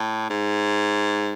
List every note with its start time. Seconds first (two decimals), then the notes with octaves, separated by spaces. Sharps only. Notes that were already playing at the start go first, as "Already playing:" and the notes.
Already playing: A2
0.30 G#2